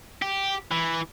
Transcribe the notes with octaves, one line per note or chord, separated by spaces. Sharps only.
G4
E3